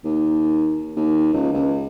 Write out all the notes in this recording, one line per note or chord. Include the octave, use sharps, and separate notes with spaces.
D#2
D#2
C#2
C#2